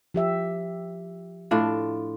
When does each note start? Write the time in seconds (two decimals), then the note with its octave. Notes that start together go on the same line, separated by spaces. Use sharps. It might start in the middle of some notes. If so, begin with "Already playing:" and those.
0.14 F3 G4 E5
1.51 A2 D4 F4